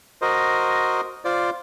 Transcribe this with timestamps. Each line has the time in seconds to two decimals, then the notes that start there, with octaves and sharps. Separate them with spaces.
0.22 F#4 A#4 C5 D#5
1.25 F4 C5 D5